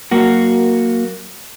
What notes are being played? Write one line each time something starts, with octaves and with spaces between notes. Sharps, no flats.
F#3 A#3 F#4